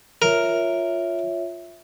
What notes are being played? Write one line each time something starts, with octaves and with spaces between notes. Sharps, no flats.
F4 A#4 C#5 E5